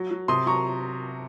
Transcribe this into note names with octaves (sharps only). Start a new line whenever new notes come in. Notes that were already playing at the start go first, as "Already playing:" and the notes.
Already playing: F#3
F#3
C3 C6 D#6
F#3 A#5 C#6